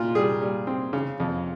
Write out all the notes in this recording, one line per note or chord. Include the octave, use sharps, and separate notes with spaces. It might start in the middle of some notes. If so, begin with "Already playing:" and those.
Already playing: A#2 F4
G3 G#4
G3
C4
C#3
F2